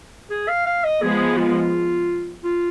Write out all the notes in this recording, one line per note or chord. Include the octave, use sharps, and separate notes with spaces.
G#4
F5
F5
D#5
F3 G#3 B3 G#4
F4
F4